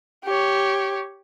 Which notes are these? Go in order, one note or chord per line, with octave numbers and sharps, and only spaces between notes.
G4 C#5